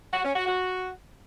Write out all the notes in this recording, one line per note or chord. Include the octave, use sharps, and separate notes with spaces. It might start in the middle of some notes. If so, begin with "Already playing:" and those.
F#4
C#4
F#4
F#4